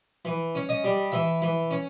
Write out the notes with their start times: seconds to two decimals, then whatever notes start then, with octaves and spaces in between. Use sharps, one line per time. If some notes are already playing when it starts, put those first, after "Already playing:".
0.25 E3
0.55 C#4
0.69 D#5
0.84 G3
1.12 E3 E5
1.42 E3
1.71 C#4